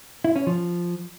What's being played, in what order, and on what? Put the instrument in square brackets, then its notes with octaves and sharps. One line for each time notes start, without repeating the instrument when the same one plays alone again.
[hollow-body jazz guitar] E4
C#4
F3